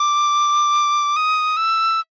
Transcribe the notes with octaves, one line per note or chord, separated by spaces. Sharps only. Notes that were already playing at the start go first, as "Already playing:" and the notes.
Already playing: D6
D#6
E6